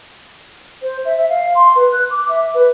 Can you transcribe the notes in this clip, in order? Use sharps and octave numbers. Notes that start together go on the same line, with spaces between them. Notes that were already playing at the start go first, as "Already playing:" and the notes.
C5
E5
E5
F5
C6
B4
F#6
D6
E5
B4